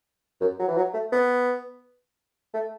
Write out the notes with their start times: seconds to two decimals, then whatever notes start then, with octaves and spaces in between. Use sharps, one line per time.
0.41 F#2
0.59 F#3
0.68 E3
0.76 F#3
0.93 A3
1.12 B3
2.54 A3